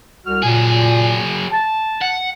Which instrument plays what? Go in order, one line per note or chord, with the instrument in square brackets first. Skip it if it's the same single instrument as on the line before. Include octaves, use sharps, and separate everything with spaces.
[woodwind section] C2 F#4 F6
[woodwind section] A#2 [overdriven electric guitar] F#3 G#4
[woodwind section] A5
[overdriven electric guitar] F#5